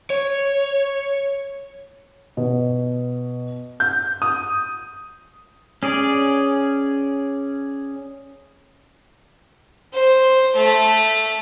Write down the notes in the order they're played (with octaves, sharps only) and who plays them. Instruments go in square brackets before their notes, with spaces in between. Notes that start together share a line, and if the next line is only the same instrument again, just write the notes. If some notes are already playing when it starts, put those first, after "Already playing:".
[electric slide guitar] C#5
[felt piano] B2
G6
D#6
[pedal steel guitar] C#4 G#4 D5
[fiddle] C5
A3